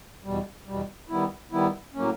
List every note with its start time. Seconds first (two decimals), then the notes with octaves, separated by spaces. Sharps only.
0.24 E2 B2 G3
0.66 E2 B2 G3
1.09 D#3 G3 B3 E4
1.52 D#3 G3 B3 E4
1.94 A2 F#3 A#3 C#4